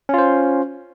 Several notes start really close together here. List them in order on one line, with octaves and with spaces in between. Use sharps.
C#4 F4 C5